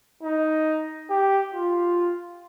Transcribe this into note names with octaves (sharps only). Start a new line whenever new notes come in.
D#4
G4
F4